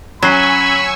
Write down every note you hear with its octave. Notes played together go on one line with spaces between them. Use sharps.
F#3 C#4 G#5 B5 C#6 E6 C7 D#7